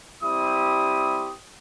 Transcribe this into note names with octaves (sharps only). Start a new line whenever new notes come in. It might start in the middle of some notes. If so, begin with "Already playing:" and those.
G3 C4 E4 G4 D#6